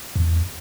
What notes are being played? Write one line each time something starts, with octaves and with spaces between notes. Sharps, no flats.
E2